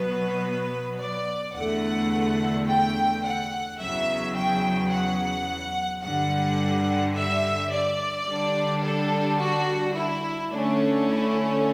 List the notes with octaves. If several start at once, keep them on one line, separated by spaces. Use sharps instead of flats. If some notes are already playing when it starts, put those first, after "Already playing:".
Already playing: B2 F#3 B3 B4
D5
E2 D3 A3 F#5
G5
F#5
E2 C#3 F#3 E5
G5
F#5
G2 D3 G3 F#5
E5
D5
D3 G3 D4
A4
F#4
E4
D3 A3 C#4 D4
E4